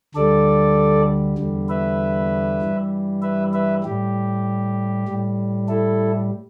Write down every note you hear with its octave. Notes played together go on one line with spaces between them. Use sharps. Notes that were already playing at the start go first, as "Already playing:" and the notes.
D2 D3 G3 A4 D5
E2 D3 G3
B4 E5
G2 E3 G3
B4 E5
B4 E5
A2 G3 G4
A2 G3
E4 A4